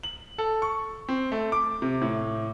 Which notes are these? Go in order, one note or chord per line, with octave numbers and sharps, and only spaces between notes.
F#7
A4
C#6
C4
A3
D6
C3
A2